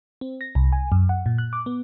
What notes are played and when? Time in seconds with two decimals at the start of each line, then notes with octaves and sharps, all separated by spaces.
0.21 C4
0.41 A#6
0.55 C2
0.72 G#5
0.92 F#2
1.09 F#5
1.26 A#2
1.38 F#6
1.53 D6
1.66 B3